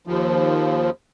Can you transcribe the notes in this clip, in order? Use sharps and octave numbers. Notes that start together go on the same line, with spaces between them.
D#2 F3